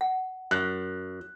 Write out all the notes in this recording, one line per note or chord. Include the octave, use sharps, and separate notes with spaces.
F#5
F#2 F#6